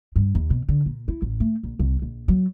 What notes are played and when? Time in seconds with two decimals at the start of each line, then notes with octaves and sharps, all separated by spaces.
0.16 G2
0.35 D#2
0.50 B2
0.69 D3
0.86 A#2
1.08 E4
1.22 A1
1.40 A3
1.63 A#1
1.79 C2
2.02 A#1
2.28 F#3